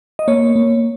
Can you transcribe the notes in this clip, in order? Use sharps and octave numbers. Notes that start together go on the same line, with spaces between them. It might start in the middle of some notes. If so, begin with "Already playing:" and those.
D#5
A#3 C#5
A#3